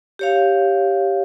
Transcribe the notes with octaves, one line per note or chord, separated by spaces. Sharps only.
G4 C#5 F5